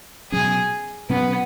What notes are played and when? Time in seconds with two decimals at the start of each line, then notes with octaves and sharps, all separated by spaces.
0.31 B2 F#3 C#4 G#4
1.10 B2 F#3 B3 C#4